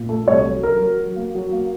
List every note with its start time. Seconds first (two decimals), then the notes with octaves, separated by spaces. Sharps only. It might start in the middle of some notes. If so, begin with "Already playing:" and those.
Already playing: A#2
0.09 A3
0.26 C2 C#5
0.45 F#3
0.63 F#3 A#4
0.80 F#3
0.98 F#3
1.16 A#3
1.35 F#3
1.52 A#3